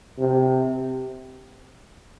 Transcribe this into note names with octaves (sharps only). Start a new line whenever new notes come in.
C3